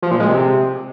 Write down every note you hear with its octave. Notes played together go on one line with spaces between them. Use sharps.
F3
A#2
G#3
C3